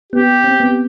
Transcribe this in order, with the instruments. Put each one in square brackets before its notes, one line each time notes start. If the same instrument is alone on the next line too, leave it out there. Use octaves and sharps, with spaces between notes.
[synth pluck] B3 [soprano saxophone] G4
[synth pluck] C4
B3